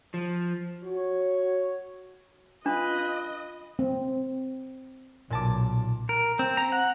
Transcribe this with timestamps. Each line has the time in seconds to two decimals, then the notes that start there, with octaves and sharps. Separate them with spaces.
0.14 F3
0.85 F#4 C#5
2.66 D4 F4 B4 D#5
3.79 C4
5.30 B1 A#2 A5 D6
6.09 A#4
6.39 C4
6.57 A#5
6.72 F#5